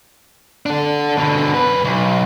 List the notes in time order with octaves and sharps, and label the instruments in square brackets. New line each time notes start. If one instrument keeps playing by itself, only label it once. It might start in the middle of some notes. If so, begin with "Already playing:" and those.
[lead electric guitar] D4 A4
B2 D3
F#2 B4
B1